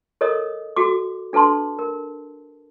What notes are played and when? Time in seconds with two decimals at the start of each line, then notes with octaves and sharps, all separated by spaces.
0.21 A4 A#4 C#5 D#5 D#6
0.76 F#4 A4 D6
1.33 D4 A4 B4 A5 C6
1.79 A#4